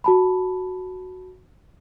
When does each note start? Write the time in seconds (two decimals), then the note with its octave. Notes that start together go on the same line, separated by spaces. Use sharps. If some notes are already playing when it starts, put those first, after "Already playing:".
0.04 F#4 A5 B5